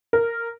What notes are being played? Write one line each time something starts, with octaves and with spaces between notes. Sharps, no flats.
A#4